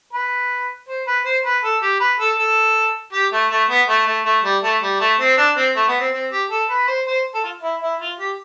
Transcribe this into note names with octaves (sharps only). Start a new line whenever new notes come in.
B4
C5
B4
C5
B4
A4
G4
B4
A4
A4
G4
A3
A3
B3
A3
A3
A3
G3
A3
G3
A3
C4
D4
C4
A3
B3
C4
C4
G4
A4
B4
C5
C5
A4
F4
E4
E4
F4
G4